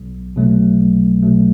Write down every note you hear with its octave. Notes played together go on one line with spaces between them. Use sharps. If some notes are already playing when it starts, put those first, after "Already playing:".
Already playing: B1
B2 F#3 A3
B1
B2 F#3 A3